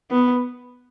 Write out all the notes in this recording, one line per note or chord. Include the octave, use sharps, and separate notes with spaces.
B3